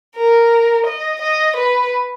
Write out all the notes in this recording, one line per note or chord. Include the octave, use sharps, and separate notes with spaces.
A#4
D#5
D#5
B4